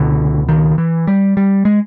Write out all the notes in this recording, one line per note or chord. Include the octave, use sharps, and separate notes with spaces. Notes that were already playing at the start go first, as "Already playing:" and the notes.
Already playing: C#2 B2 D3
D#3
E3
G3
G3
G#3